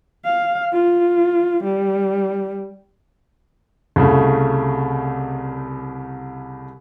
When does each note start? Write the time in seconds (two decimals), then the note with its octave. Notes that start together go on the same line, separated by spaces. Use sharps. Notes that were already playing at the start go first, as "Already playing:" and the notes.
0.25 F5
0.72 F4
1.64 G3
3.96 C2 C#3 A3